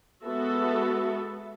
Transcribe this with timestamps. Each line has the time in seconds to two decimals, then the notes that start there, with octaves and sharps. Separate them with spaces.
0.23 G#3 B3 F#4 A4 E5